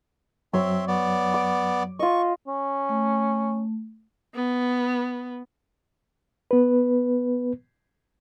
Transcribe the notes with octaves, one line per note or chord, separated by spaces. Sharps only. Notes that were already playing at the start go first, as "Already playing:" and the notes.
F#2 F#3 C4 C#5 E5 C6
B3 D5
D6
F4 D#5 C#6
C#4
A3
B3
B3 B4